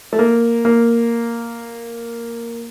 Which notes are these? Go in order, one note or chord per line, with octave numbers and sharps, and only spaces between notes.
A3
A#3
A#3